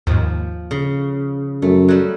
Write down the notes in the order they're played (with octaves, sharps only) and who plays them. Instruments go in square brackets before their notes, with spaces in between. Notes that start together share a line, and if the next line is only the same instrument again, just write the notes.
[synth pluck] D#2 G#2 [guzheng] F3
[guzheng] C#3
[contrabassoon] F#2 [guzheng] A3
[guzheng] F#3 G3